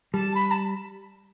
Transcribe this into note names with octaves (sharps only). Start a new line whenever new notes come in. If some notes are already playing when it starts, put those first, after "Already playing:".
G3 A5
B5
A5